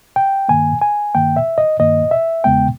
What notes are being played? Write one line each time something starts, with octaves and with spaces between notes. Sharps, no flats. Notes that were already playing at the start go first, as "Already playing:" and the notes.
G5
G2 D#3 A#3 G#5
G#5
G2 D#3 A#3 G5
E5
D#5
G2 D#3 A#3 D#5
E5
E2 C#3 G#3 B3 G5